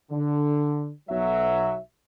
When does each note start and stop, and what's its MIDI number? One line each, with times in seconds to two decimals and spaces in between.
0.11 0.91 50
1.09 1.77 35
1.09 1.77 54
1.09 1.77 76